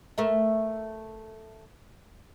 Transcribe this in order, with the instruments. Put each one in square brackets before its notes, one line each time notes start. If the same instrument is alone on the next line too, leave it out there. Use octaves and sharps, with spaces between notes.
[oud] A3 A#4 E5